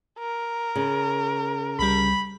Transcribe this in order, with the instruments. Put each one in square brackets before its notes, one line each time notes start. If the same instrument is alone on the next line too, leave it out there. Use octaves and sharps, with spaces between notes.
[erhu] A#4
[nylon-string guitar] C#3
[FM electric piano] C2 G3 [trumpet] B5